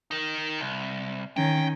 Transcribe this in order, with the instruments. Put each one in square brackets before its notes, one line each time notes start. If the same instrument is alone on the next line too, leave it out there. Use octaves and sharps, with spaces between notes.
[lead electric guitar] D#4 A#4
C2
[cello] D#3 C#4 [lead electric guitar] G5